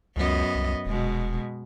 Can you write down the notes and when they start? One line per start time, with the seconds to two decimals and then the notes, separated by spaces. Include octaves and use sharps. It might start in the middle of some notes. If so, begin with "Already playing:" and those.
0.16 C#2 F#2 B3 D#5
0.55 C2
0.86 D#1 B2 G#3